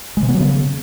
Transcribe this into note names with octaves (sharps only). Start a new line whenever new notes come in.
G#3
C3
B3
F#3
C#3